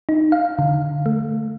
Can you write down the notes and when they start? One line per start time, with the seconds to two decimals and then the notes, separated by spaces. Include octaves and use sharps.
0.09 D#4
0.32 F5
0.59 D3
1.06 A3